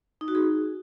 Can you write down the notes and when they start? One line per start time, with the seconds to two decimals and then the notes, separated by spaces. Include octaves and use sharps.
0.21 D#4
0.28 F#4
0.35 G#4